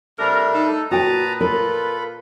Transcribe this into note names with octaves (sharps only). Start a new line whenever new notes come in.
C3 G3 A3 D4 A#4
D#4 A4
A#2 F#4 B4 G5 A5 A#5 D#6
F4 A4 A#4 B5